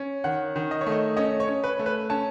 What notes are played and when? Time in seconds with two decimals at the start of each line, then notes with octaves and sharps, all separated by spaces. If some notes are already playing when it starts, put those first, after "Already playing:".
Already playing: C#4
0.24 D#3 F#5
0.56 D#3
0.71 D#5
0.81 C#5
0.86 A3
0.92 D#5
1.17 C#4 D#5
1.40 C#5
1.48 C#4
1.64 B4
1.79 A3
1.86 B4
2.10 C#4 A5